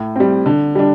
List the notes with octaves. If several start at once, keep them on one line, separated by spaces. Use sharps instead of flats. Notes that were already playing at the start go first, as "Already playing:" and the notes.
Already playing: A2
G3 C4
D3
G3 D4